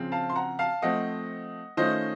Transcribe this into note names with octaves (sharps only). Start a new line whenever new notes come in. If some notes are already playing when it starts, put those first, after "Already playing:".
Already playing: C#3 F3 C4
F5 A5
C6
F#5 A#5
F5 A5
F3 A3 C4 D#5 F#5
D#3 A3 C#4 F4 C5 D#5